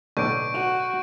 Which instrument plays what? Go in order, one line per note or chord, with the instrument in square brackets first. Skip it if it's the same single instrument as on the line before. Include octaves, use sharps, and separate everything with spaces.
[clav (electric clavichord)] B1 A2 D3 [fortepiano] D4 [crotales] C#6 G6 D7
[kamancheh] F#4